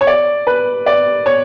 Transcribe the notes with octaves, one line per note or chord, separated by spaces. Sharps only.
C#5
D5
B4
D5
C#5